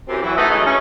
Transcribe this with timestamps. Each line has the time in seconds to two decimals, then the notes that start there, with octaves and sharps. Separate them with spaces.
0.09 F#2 E3 C4 G4
0.22 E3 F#3 E4
0.36 A3 B3 D#4 B4 D#5 E5
0.51 E3 F#3 G#3 A3 D#4 E4
0.66 C#4